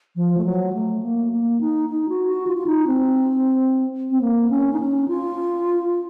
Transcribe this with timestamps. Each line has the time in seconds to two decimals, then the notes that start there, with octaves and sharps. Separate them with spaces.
0.16 F3
0.37 A3
0.45 F#3
0.73 A3
1.03 A#3
1.32 A#3
1.61 D#4
1.89 D#4
2.09 F#4
2.28 F#4
2.47 F4
2.57 F4
2.66 D#4
2.87 C4
4.11 C4
4.21 A#3
4.50 C#4
4.73 D#4
4.80 C#4
5.08 F4